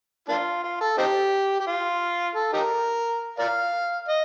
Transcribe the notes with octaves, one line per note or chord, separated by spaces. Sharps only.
A#3 D4 F4
F4
A4
C4 D#4 G4
G4
F4
A4
D#4 G4 A#4
A#4 D5 F5
D#5